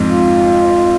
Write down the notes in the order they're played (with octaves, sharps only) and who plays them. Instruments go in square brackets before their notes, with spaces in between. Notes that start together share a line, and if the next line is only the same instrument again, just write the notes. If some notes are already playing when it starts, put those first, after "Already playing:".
Already playing: [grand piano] F2 G#2
[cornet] F4